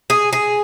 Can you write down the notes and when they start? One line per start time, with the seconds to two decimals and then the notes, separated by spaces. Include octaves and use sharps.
0.10 G#4
0.33 G#4